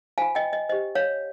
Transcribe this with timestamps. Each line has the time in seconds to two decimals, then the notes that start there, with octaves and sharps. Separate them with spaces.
0.18 F4 C5 F5 G#5
0.35 D#5 G5
0.53 D#5
0.69 G4 C5 D#5
0.95 C#5 F5